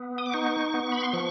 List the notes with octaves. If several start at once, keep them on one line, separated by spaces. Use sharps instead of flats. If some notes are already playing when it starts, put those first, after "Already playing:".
Already playing: B3
D#6
D6
D#4 C#6
B3
B5
C6
F3 C#6